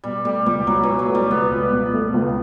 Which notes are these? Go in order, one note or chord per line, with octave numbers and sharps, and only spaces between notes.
B2 G3
G3 A3
C#2 G3
C#2 F#3
E3
B2
F#3
A3
G3
C#2 B3
C#2
B2
A3
C#2